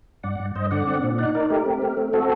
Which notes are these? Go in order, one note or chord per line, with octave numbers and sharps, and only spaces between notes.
G2 D5 F#5
G2
G2 C5 D#5
D3 D5 F#5
C4
A#2
D#4 D5 F#5
D#4 A#4 D5
A3 G4 A#4
C4
A3
C4
C4 F#4 A4